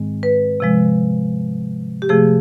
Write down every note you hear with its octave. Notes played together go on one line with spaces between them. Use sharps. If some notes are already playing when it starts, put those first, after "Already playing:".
Already playing: G#2 D#3 G#3 C4
B4
C3 F3 G#3
G4
C3 F3 A3 G#4